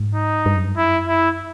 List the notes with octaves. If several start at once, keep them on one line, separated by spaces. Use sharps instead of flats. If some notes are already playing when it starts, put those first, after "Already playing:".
Already playing: G#2
D#4
G2
F#2
G2
F#2 E4
E4